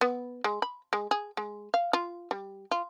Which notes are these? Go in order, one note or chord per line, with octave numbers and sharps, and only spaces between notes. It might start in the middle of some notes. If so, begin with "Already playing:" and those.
B3
G#3
B5
G#3
G#4
G#3
F5
F4
G3
F4